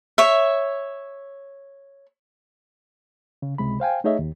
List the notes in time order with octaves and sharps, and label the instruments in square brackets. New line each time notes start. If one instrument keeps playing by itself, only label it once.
[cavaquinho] C#5 E5
[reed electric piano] C#3
C#2 C3 G#3 B5
C5 F5 G5 G#5
A3 D#4 G#4 C#5 D#5 E5
D#2